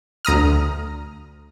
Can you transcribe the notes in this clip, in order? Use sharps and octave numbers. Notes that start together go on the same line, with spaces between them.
D2 A#5 D#6 F6